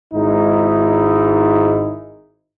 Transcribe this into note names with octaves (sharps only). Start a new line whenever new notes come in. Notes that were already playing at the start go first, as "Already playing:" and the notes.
G#1 G#2 D#4 E4